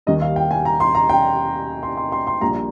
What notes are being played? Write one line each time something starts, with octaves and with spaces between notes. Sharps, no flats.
D#2 D#3 G3 D#5
F5
G5
G#5
A#5
C6
A#5
G5
C6
C6
C6
C6
A#1 A#2 G3 A#5